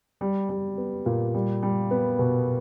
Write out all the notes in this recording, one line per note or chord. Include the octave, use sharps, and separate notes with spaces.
G3
G3
B3
A#2
G3
G3
B3
B2